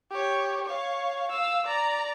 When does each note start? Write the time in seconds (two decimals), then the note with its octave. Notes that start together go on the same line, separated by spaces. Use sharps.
0.11 G4 C#5
0.66 C#5 F5
1.28 F5 E6
1.67 D5 A#5